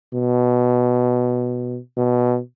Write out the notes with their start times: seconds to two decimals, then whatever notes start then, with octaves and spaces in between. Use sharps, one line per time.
0.14 B2
1.97 B2